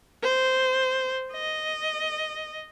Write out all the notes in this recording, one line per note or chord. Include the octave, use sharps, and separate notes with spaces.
C5
D#5